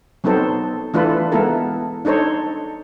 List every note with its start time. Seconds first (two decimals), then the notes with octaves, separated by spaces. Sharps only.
0.24 F#3 B3 C4 D#4 A4 C5
0.94 E3 A3 D4 F4 A4 B4
1.32 G#3 B3 E4 A4 A#4
2.05 D4 D#4 A4 C5 C#5